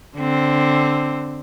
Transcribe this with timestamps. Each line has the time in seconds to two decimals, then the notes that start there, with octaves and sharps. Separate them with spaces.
0.16 D3 C4